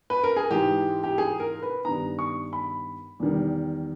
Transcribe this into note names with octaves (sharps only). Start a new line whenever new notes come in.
B4
A#4
G#4
G#2 E3 G#3 D#4 G4
G4
G#4
A#4
B4
G2 D#3 G3 B3 D#4 A#5
C#6
B5
E2 D#3 G3